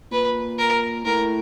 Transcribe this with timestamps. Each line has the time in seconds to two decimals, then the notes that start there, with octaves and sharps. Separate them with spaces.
0.11 A#2 B4
0.58 A#4
1.05 A2 A#4